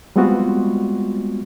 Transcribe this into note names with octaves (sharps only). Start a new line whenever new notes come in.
G3 G#3 B3 C4 F4 F#4